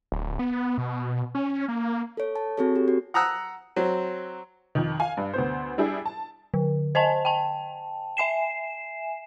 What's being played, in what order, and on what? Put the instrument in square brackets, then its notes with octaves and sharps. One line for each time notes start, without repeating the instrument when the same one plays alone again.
[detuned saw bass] D1
B3
B2
C#4
A#3
[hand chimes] A4 C#5
A5
C4 F#4 G#4 A4 C#5
G4
F#4
[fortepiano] F#5 A#5 D#6 E6 F#6
F#3 C4
[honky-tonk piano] F2 D#3
F5 G#5
G2
D2 B3 C5
G3 D4 E4 G4 G#4
A5
[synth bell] D3
C5 D#5 G#5 A5
G5 A5
E5 G#5 C7 E7